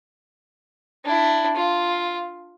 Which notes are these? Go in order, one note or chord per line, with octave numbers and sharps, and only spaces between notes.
D4 E4
F4